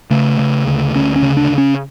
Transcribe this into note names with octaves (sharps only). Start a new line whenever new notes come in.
C#3 A3
C#3
D2
D2 C#4
C#4
C#3
D4
C#3
C#4